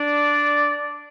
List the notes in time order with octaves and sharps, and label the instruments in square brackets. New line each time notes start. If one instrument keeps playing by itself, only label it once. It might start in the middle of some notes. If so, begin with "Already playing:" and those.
Already playing: [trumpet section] D4 [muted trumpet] D5